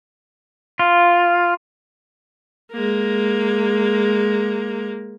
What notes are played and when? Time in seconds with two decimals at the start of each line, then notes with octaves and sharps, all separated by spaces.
0.79 F4
2.72 G#3 A#3